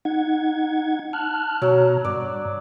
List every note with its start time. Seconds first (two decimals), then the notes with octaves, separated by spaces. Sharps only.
0.05 D#4 F#5 G#6
1.13 A5 F6 F#6
1.62 B2 F#3 A#5
2.05 G2 D5